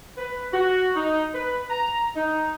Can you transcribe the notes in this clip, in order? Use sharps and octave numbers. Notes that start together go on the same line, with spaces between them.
B4
F#4
D#4
B4
A#5
D#4